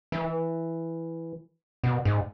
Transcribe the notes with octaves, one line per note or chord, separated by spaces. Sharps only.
E3
B2
G#2